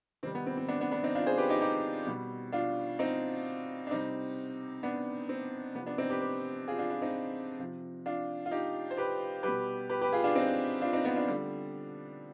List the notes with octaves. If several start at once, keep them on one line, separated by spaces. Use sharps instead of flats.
C3 D#3 G3 C4
B3
C4
C4
B3 D4
B3 D4
B3 D4
C4 D#4
D4 F4
G#4 C5
G4 B4
D#4 G4
D#4 G4
B2 G3
D4 F4
C4 D#4
D4
C3 G3 C4 D#4
B3 D4
C4
C3 F3 B3
B3 D4
C4 D#4
G4 B4
G4 B4
F4 G#4
D4 F4
D4 F4
C4 D#4
C3 F3
D4 F4
F4
D#4 G4
C5
G4 B4
B2 G3 G4 B4
G4 B4
G4 B4
F4 G#4
D4 F4
C4 D#4
D4 F4
C4 D#4
B3 D4
D4 F4
D3 G3